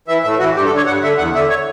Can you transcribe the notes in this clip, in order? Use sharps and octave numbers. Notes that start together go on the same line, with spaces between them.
E3 E5
A2 E5
E3 F#4
G2 G4
A4
D3
C#5
G2 F#5
D3 E5
E2 F#5
D3 E5
C#5